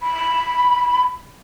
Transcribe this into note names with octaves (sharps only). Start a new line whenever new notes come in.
B5